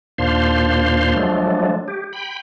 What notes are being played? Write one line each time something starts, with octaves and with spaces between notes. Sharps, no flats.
D#2 A#2 D4 C5 F5 C6
F3 F#3 G#3 A3 D4
G4
G5 B5